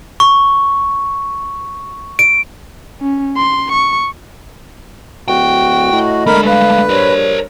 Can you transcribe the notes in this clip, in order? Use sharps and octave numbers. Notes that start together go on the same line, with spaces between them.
C#6
D7
C#4
C6
C#6
D1 F#4 G5
A2 D#5
D3 G#3 A3 A#4 B5
B4 F5
G2 A#4 C5 C#5